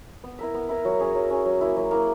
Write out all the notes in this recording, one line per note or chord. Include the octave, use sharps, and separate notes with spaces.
B3
E4 A#4 E5
B3
E4 A#4 E5
F#3
C#4 G#4
F#3
C#4 G#4
F#3
A#3 E4
F#3
A#3 E4